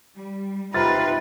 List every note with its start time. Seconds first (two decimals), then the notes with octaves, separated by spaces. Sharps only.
0.16 G3
0.74 G#2 C3 D#4 F4 B4 A#5 F6 A6